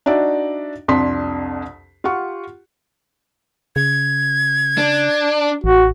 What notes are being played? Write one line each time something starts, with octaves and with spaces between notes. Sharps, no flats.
D4 D#4 F#4 D5 E5
C2 F2 D4 C6 B6
F4 G4 F#5 C#6
C#3 G#6
D4
A1 F#4